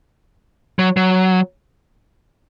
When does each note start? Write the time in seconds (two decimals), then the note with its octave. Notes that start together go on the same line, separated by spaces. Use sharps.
0.79 F#3
0.97 F#3